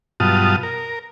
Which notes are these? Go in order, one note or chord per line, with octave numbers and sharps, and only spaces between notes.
G2 B2 F#3 F4 A5 D#6
A#4